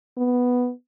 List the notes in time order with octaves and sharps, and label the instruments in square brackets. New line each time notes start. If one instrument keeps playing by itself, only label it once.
[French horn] B3